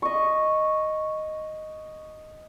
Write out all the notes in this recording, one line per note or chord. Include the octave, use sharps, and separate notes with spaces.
D#5 C#6